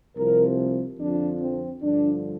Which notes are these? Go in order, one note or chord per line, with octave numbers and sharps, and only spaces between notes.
C2 C3 F3 A#4
F2 D3 F3 D4
C4
G2 D3 F3 D4